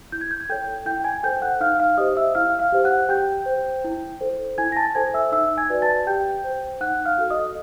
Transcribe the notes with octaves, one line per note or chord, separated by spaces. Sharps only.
E4 G6
G#6
G6
G#6
A4 C#5 G5 G6
E4 G5 G6
G#5 G#6
A4 C5 G5 G6
F#5 F#6
D#4 F5 F6
F5 F6
G4 C5 D#5 D#6
E5 E6
E4 F5 F6
F5 F6
G4 C5
F#5 F#6
G4 G5 G6
C5
E4
A4 C5
E4 G#5 G#6
A#6
A5 A6
A4 C5 G#5 G#6
E5 E6
D#4 E5 E6
G#5 G#6
F#4 B4 D5
A5 A6
G4 G5 G6
C5
D#4 F#5 F#6
F5 F6
F#4 A4
D#5 D#6